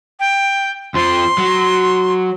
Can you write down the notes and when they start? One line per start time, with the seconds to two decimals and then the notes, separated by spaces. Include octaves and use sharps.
0.20 G5
0.94 F2 F3 C6
1.38 F#3